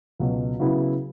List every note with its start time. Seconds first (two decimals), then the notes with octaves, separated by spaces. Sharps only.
0.19 C#2 B2 F#3
0.60 C#3 F#3 B3 E4